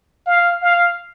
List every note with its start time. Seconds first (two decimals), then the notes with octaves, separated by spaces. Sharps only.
0.26 F5
0.62 F5